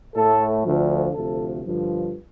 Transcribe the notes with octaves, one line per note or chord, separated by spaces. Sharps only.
A2 A3 A4
D2 D3 F3
D2 C3 F3 A3 A4
G2 D3 F3